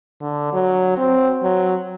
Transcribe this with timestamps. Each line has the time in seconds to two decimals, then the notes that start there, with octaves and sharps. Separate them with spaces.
0.22 D3
0.53 F#3
0.98 C4
1.43 F#3